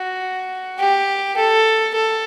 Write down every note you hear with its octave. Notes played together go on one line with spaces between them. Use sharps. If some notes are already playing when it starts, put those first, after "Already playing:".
Already playing: F#4
G4
A4
A4